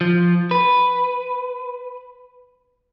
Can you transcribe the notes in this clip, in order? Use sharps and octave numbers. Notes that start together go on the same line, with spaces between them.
F3
B4